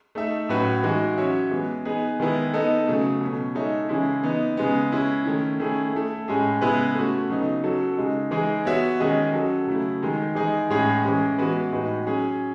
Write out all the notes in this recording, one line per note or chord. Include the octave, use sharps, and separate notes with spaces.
A3 D#4 A4 E5
A2 F#3 C#4 F#4 B4
E3 G#3 D#4 F#4
F#3 C#4 F#4 C#5 E5
E3 G#3 B3
B3 D#4 G#4 B4
D#3 G#3 B3 E4 B4
B3 D#4 A4 D#5
C#3 F#3 A3
B2 F#3 C#4
G#3 D#4 A4 C#5 E5
C#3 E3 G#3 C#4 E4
E3 B3 D#4
C#3 G#3 B3
G#3 C#4 E4
D#3 A3 C#4 E4
D#3 A3 C#4 E4 G#4
A3 E4 A4
A2 G#3 C#4 G#4
C#3 G#3 B3 E4 B4
A3 C#4 F#4
C#3 F#3 B3 D#4
F#3 C#4 F#4 A4 C#5
C#3 G#3 D#4
E3 G#3 D#4 G#4
B3 F#4 C#5 E5
D#3 G#3 C#4 G#4 D#5
F#3 C#4 F#4 A4
C#3 F#3 A3 E4
D#3 G#3 D#4
E3 G#3 D#4 G#4
A2 G#3 C#4 G#4
E3 G#3 C#4
E3 G#3 B3 F#4 B4
A2 G#3 D#4 F#4 B4
F#3 C#4 G#4